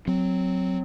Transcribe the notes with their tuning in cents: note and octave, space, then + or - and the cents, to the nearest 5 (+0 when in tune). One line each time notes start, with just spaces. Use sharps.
F#3 +0 C4 -5